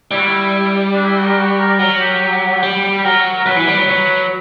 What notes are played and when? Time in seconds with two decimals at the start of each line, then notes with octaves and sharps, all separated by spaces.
0.11 G3 E4
0.19 F#4
0.26 E4
0.95 D4
1.05 E4
1.16 F#4
1.26 A#4
1.37 F#4
1.58 A#4
1.79 F#3 A#4
2.00 G4
2.63 G3
2.97 G4
3.04 F#3 A#4
3.38 A#4
3.46 F#3 B4
3.57 E3
3.67 G3
3.78 F#3
3.88 F#3